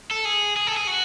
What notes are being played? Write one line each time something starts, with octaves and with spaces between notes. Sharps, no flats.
A4
G#4
G#4
A4
G#4
F#4